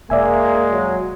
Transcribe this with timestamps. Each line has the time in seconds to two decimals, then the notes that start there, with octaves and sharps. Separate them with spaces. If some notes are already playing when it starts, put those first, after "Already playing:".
0.10 E1 G#3 A#3 D5 E5 G#5
0.71 F#3